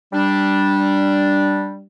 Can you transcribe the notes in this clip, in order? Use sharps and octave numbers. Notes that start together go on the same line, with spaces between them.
G3 D4